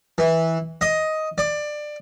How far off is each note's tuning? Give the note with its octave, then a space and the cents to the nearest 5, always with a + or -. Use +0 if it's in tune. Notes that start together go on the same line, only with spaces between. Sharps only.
E3 -15
D#5 +10
D5 +20